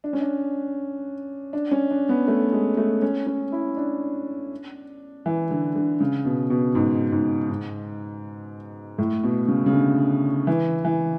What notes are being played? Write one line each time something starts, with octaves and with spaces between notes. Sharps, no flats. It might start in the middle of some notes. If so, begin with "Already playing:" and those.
D4
C#4
D4
D4
C#4
D4
B3
A3
G#3
A3
C#4
C#4
E4
D4
E3
D3
D3
C#3
B2
B2
G#2
G#2
G#2
A2
B2
C#3
C#3
D3
E3
E3